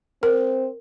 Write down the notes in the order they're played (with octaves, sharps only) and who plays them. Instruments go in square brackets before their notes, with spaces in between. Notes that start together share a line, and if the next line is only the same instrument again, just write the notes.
[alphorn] C4 [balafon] A#4